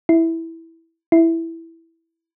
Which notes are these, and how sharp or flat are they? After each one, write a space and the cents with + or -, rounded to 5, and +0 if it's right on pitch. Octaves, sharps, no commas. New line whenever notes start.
E4 -5
E4 +0